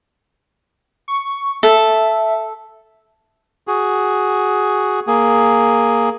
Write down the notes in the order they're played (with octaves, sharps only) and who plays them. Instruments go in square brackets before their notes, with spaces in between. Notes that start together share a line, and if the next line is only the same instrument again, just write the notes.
[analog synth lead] C#6
[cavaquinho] A4 [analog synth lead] E5
[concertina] F#4 G#4
A#3 G#4